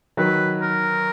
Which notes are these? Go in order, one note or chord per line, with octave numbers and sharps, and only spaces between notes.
D#3 F#3 B4
A#4